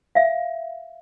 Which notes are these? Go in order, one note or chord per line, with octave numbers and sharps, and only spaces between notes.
E5 F5